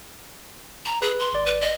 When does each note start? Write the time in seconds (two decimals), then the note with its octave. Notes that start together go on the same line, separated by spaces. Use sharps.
0.85 A#5
1.02 G#4 B4
1.20 C6
1.33 G#1 D5
1.46 B4
1.61 D#5